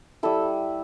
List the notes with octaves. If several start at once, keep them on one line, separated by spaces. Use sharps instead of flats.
G3 E4 A4